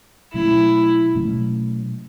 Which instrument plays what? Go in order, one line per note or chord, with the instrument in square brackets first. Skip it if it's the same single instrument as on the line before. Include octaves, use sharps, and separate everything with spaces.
[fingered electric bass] B2 F#3 A3 C#4 [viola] E4
[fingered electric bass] B2 F#3 A3 C#4